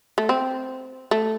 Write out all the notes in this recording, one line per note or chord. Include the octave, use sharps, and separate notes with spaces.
A3
C4
A3